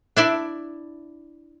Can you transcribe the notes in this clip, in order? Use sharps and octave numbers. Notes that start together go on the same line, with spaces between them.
D4 E4 D5